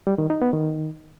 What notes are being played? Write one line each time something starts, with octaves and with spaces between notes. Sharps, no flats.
G3
D#3
D#4
B3
D#3